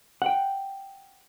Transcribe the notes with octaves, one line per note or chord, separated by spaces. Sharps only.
F#5 G5